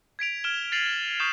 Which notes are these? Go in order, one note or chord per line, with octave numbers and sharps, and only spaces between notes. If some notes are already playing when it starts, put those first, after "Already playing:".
G#6 B6 D7 F7
F6 D7 E7 G7
A6 B6 C7 D#7 F7 F#7
C#6 D#6 G6 C7 E7